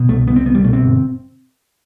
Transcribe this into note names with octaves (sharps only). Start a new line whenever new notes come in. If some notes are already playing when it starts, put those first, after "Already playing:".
Already playing: B2
C2 A3
C2 B3
C4
C2 B3
G3
B2 A3
C4
G1